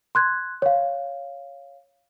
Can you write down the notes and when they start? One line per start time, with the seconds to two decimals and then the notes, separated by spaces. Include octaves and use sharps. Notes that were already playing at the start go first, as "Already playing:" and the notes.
0.15 C6 F#6 G#6
0.62 C#5 F5